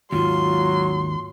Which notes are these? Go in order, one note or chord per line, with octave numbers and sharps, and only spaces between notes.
D#2 G#2 D#3 F#3 F4 C6